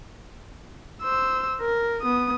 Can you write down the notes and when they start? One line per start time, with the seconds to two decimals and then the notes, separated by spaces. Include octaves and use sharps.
1.02 C5 E6
1.61 A#4
2.02 B3 D#6